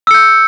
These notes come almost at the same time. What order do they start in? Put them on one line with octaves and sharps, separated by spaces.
E6 C#7 G6